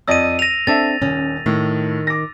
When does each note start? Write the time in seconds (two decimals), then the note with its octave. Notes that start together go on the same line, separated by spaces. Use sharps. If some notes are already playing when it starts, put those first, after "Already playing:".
0.08 F2 D5 D#5 E6 D#7
0.39 A#6 D#7 F7
0.67 C4 D4 A4 E5 A6
1.02 D#1 C#4
1.46 A2 D#3
2.07 D6 A#6